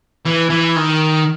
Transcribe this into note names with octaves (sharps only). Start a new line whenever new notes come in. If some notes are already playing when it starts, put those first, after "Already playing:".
E3
E3
D#3